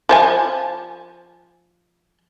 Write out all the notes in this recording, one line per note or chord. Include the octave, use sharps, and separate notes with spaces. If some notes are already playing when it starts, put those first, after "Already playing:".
F3 C5 G#5